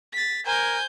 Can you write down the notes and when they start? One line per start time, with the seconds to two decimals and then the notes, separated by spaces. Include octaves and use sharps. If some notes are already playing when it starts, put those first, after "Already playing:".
0.13 A6 B6
0.46 A#4 C5 G#5 G6